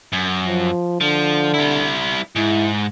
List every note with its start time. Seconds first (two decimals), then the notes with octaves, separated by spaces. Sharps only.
0.12 F#2
0.47 F3
1.01 D3 F3
1.54 G3 E4
2.36 G#2 E4